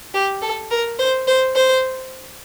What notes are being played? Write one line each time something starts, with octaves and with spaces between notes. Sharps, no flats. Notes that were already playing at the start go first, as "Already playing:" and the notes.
G4
A4
A#4
C5
C5
C5